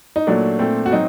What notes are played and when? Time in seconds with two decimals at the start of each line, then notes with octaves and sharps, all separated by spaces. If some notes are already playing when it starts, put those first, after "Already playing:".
0.16 D#4
0.27 A#2 F#3 A3 D4
0.59 A#2 A3 C4
0.86 F#4
0.91 F#3 C4 D#4